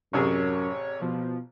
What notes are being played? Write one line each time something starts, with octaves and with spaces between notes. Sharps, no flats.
A1 F#2 C3 G#4 C#5
B2 F3